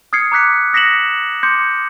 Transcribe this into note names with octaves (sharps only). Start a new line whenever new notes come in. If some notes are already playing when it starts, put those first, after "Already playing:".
D#6 F6 G#6 C7 C#7
A#5 D6 F#6 B6 C#7
D#6 A#6 B6 C#7 E7 F#7
C6 D6 G6 C#7